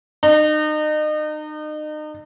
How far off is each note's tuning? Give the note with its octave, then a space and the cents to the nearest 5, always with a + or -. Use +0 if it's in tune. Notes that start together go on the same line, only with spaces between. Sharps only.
D#4 -35